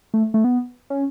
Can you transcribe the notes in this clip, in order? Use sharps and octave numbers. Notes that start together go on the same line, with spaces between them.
A3
A3
B3
C#4